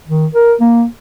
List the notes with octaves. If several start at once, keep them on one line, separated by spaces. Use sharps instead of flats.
D#3
A#4
A#3